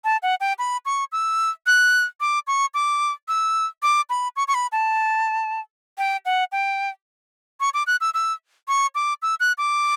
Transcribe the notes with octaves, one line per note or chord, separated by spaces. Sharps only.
A5
F#5
G5
B5
C#6
E6
F#6
D6
C#6
D6
E6
D6
B5
C#6
C#6
B5
A5
G5
F#5
G5
C#6
D6
F#6
E6
E6
C#6
D6
E6
F#6
D6